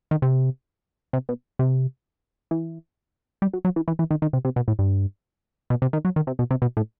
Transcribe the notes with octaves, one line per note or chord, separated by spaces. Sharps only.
D#3
C3
C3
B2
C3
E3
G3
F#3
F#3
E3
E3
E3
D#3
D#3
C3
C3
B2
A2
G2
B2
C3
D#3
F#3
D#3
C3
B2
C3
B2
A2